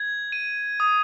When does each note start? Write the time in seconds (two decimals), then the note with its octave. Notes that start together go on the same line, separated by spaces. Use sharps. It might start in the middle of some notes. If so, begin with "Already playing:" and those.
Already playing: G#6
0.32 D#7
0.80 D#6